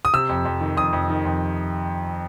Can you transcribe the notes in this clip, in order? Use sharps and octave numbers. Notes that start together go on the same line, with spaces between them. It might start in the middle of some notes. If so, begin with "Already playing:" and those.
D#6
C3 E6
F2
F2
D#3
F2 D#6
F2
D#3
F2